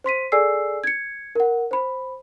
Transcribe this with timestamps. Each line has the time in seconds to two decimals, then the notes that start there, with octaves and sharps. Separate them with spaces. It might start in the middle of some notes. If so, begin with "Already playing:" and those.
0.04 C5 C6 B6 D#7
0.32 G#4 A4 D5 G#5 E6 C7
0.84 G#6 C#7
1.35 A#4 F#5
1.71 C5 B5